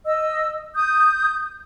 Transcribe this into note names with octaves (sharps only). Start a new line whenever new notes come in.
D#5 E6
D#6 G6